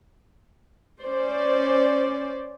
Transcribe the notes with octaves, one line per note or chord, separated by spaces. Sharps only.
C#4 C5 D5